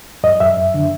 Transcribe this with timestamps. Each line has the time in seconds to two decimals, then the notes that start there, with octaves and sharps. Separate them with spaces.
0.24 F#2 D#5
0.40 F#2 E5
0.58 F#2
0.74 D3